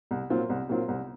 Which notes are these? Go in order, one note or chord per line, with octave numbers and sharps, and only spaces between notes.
C2
A#2 F#3 C4 F4
C2
A#2 F#3 C4 F4
C2